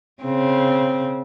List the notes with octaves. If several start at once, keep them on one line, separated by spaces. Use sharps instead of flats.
C#3 C4